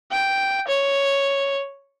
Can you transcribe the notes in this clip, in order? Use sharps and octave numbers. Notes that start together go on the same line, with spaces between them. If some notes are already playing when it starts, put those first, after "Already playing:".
G5
C#5